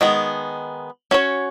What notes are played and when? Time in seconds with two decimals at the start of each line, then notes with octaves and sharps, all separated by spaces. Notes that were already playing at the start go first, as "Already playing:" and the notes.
0.01 D#3 G#3 B3
1.11 C#4 F#4 C#5